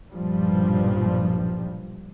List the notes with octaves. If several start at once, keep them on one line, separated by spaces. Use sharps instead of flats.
B1 G2 A#2 F3 G3